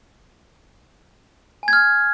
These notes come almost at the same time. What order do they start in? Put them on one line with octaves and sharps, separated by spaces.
G#5 G#6 F6